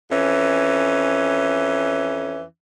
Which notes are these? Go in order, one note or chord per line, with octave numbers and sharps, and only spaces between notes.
F2 E3 C#4